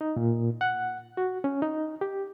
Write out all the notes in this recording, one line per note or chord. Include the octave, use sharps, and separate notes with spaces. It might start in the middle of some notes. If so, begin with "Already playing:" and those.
D#4
A#2
F#5
F#4
C#4
D#4
G4